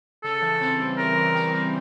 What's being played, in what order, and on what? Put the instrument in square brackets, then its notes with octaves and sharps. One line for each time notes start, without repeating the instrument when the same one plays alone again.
[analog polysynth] C#3 [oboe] A4
[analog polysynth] E3
C4
G3
[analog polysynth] C#3 [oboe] A#4
[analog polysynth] E3
C4
G3